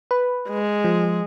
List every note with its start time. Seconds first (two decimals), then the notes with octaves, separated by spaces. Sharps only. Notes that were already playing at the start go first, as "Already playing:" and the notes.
0.11 B4
0.49 G#3
0.84 F3